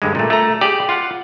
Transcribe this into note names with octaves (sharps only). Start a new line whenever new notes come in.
G2 D3 G#3
A#2 A3
A3 A#5
G4 G#4 D5 G5
F4 F5 F#5